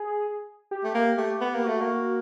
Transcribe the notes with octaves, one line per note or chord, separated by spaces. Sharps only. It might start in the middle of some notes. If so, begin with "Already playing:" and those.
Already playing: G#4
G4
A3
A#3
A3 G4
B3
A#3
A3 F#4
A#3